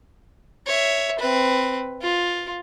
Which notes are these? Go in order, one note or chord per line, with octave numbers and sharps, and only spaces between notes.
C#5 E5
C4 B4
F4